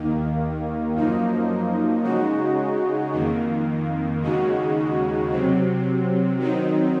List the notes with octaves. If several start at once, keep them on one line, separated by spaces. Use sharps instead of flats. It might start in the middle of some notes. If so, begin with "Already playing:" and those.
Already playing: D#2 D#3 A#3
F#2 F3 A#3 D#4
C#3 G#3 D#4 F#4
F2 D#3 A#3
D#2 C#3 G#3 D#4 F#4
C3 F#3 C4
D#3 F#3 C4 D#4